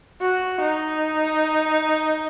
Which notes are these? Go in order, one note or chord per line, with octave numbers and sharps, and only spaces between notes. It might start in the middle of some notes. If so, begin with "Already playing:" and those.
F#4
D#4